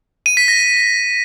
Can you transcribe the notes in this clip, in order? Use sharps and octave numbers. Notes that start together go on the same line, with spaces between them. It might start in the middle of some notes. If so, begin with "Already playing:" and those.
D#7
B6
A#6